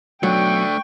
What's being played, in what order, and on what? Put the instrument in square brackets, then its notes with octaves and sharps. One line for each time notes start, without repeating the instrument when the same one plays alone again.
[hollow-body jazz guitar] B1 F#3 [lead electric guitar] A3 D4 [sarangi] G5 [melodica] C#6